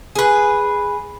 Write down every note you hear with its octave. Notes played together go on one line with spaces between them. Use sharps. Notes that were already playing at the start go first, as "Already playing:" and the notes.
G#4 B4